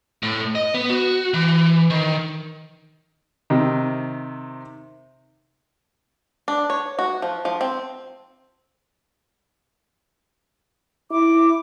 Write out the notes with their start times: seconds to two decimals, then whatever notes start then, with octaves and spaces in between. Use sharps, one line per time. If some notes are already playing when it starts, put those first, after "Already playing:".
0.23 A2
0.55 D#5
0.74 B3
0.90 F#4
1.34 E3
1.90 D#3
3.50 C3 D#3
6.48 D4
6.70 C#5
6.99 F#4
7.22 F3
7.45 F3
7.61 C4
11.11 E4 D6